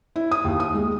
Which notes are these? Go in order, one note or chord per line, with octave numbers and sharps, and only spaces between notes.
E4
D#6
D#2
D#6
G#3